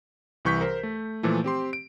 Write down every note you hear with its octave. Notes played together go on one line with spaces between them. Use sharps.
C2 E3 C#6 G6 B6
A#4 C5
A3
A#2 E3 F3 A3
C4 G4 C6
D7